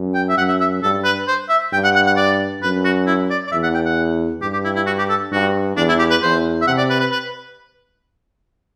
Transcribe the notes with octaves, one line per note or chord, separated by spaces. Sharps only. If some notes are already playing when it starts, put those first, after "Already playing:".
Already playing: F#2
G5
E5
F#2 F#5
E5
E5
G2 A4
B4
C5
E5
G2 G5
F#5
F#5
F#5
D5
F#2 B4
F#4
E4
D5
D5
E2 E5
F#5
G5
F#5
G2 G4
G4
E4
E4
F#4
G4
A4
G2 F#4
E2 D4
E4
G4
B4
E2 C5
E5
C3 F#5
D5
B4
B4
B4